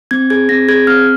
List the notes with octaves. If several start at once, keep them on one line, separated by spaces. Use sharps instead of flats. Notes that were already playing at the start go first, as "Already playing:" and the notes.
C4 G#6
G#4 G#6
C4 A#6
G#4 G#6
C4 F6